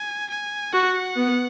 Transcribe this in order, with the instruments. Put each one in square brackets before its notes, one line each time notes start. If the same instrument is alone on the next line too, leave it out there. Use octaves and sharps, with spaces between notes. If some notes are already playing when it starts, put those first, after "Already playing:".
Already playing: [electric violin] G#5
G#5
[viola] F#4 [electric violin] F#5
[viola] B3